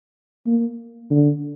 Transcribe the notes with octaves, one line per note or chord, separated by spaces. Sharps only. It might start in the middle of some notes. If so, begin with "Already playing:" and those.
A#3
D3